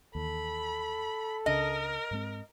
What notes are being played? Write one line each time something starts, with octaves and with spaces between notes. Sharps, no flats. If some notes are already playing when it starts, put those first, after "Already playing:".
D#2 E3 A4 B5
C#2 C#3 D4 A#4 D#5
G#2 G#3 C4